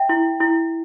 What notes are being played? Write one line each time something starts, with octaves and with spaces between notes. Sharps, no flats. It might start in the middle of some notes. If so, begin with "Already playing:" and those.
Already playing: E5 G5
E4
E4